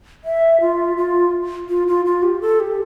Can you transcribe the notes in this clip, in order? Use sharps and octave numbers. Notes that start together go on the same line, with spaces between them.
E5
F4
F4
F4
F4
F4
G4
A4
G4